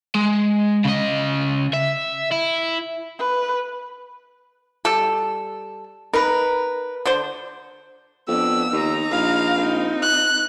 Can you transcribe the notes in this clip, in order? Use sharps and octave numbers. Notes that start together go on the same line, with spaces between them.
G#3
C#3 D#5
E5
E4
B4
G3 A4
D#4 A#4 B4
D3 C5
F2 B3 D4 E6
D#2 D#4 A#5
A#1 F5
C4 D#4
F#6